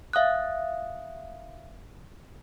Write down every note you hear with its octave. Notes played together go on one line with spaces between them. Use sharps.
E5 F5 D#6 F#6